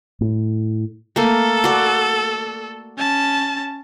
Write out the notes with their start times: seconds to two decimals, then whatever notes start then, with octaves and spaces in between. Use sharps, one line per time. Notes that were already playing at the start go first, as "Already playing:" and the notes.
0.21 A2
1.16 A3 A#3 A4
1.64 F#4 D5
2.98 C#4 A5